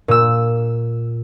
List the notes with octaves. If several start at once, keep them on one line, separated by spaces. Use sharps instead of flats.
A#2 E6